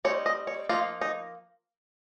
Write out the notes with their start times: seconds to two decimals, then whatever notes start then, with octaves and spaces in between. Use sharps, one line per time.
0.05 G3 C4 D#4 C#5
0.26 D#5
0.47 C#5
0.69 F3 A#3 D#4 F4
1.01 D#4